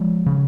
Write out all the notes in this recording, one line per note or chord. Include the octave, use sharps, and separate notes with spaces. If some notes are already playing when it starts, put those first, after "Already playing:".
Already playing: F3 G#3
C#3